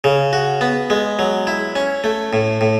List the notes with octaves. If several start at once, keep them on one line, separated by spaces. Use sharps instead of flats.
C#3
F#4
B3
G#3
F#3
E4
C#4
A3
A2
A2